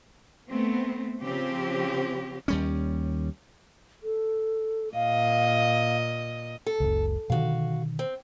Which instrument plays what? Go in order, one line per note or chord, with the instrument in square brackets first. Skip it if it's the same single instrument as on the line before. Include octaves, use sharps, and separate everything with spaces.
[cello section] A3 B3 C4
C#3 F3 C4 G4
[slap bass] D#2 G3 C#4
[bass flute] A4
[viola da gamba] A#2 D#5 [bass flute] F5
[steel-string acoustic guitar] A4
[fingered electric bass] F#1 C#2
[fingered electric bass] B2 D3 D#3 [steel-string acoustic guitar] F#4 F5
[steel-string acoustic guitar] C4